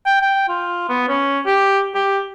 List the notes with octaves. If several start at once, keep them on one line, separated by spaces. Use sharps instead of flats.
G5
G5
F4
B3
C#4
G4
G4